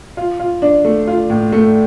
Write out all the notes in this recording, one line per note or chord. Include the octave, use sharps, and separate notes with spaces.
F4
F4
D4
A3
F4
A2
A3